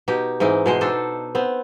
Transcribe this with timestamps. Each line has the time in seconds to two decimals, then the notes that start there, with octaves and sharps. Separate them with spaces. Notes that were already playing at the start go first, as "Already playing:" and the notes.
0.08 B2 D#4 G4
0.40 G#2 E3 C4 D#4
0.66 B2 G#3 C5
0.81 D4 D#4 A4
1.35 B3 C4